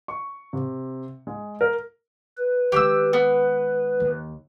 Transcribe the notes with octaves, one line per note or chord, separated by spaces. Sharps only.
C#6
C3
G#3
A#4
B4
D#3 G#3 G4 D6 E6
B3
D#2